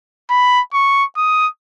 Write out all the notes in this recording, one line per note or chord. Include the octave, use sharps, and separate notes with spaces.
B5
C#6
D#6